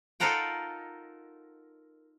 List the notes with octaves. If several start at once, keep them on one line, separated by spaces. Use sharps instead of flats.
D#4 F4 A4 A#4 F#5 G5